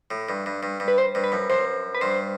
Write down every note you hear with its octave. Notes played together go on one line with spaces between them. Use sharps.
A2
G2
G2
G2
G2
B4
C5
G2
B4
F#2
F#2 C5
B4
G2 C5